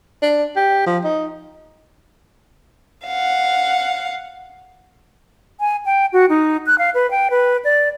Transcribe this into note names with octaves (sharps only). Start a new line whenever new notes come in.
D4
G4
F3
D#4
F5 F#5
G#5
G5
F#4
D#4
F#6
F5
B4
G5
B4
D5